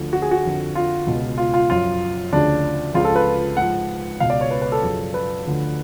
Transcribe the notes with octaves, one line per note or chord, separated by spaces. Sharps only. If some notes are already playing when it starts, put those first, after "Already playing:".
Already playing: D2 D3 F3
F#4
G#4
F#4
F2 D3 F3
F4
C#2 B2
F4
F4
F#2 F3 F4
D2 C#3 F3 D4
C#2 C#3 F3 F4
A4
B4
G#2 F3 F#5
C#2 B2 F5
D5
C#5
B4
B4
A4
F#2 C#3 F3
B4
D2 D3 F3